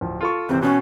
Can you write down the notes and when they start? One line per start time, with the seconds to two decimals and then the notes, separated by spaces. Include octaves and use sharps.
0.01 D1 F3
0.21 F4 A4 C#6
0.49 G#1 C3 E3 C4
0.62 B2 C#4 F#6